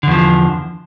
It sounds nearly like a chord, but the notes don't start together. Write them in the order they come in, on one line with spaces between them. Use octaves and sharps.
D3 E2 F3